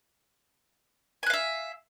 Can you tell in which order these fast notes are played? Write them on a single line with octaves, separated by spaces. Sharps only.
G#5 F#6 F5 E5